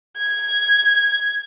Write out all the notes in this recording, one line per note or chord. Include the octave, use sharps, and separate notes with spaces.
G#6